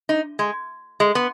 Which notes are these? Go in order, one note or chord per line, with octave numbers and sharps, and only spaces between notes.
D#4
G#3
G#3
B3